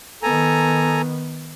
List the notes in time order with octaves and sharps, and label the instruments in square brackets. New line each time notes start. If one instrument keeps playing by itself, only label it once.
[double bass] D#3 B3 [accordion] A4 G#5 A#5